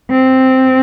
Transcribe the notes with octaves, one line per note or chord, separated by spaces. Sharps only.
C4